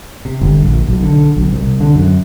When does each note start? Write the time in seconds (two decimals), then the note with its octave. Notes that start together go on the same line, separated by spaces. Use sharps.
0.25 C3
0.41 G1
0.65 A#1
0.88 B1
1.03 D3
1.36 B1
1.53 C2
1.80 D3
1.95 F#2